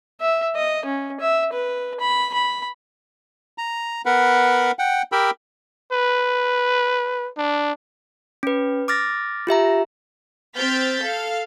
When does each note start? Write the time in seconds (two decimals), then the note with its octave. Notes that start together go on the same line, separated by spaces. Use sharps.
0.21 E5
0.56 D#5
0.85 C#4
1.20 E5
1.53 B4
2.00 B5
2.33 B5
3.58 A#5
4.06 B3 A#4 B4 F#5 B5
4.79 F#5 G5
5.12 G4 A#4 G5 B5 E6
5.92 B4
7.38 D4
8.43 C#4 B4
8.88 D6 F6 A6 A#6
9.47 F4 G4 E5 A#5
10.55 C4 F6 G6 A6 B6
11.02 A4 F5